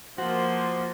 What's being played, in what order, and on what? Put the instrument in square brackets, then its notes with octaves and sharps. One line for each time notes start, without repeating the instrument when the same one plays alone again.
[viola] F3 A#3 [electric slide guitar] F#4 [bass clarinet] C5